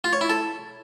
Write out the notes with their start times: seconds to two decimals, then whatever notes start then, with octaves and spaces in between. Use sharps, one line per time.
0.04 F4
0.13 C#5
0.21 E4
0.30 A4